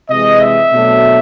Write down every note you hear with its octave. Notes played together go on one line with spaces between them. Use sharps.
C3 E3 G#3 D#5
E5
B2 F#3 A3 D4